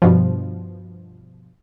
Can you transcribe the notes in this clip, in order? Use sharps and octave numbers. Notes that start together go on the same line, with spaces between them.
G2 B2 F3